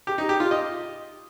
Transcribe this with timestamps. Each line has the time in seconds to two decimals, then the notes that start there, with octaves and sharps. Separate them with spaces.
0.07 G4
0.18 D#4
0.29 G4
0.40 F4
0.51 D#5